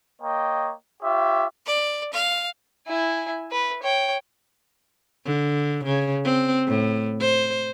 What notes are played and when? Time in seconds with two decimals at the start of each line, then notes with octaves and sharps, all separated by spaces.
0.20 A#3 C#5 D#5 G5
1.02 F4 G4 C#5 E5
1.66 D5
2.13 F5
2.87 E4 G#5
3.51 B4
3.83 C#5 G5
5.26 D3
5.85 C#3
6.25 C4
6.67 A2
7.20 C5